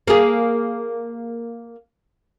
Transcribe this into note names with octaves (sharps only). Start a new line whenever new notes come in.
A#3 G#4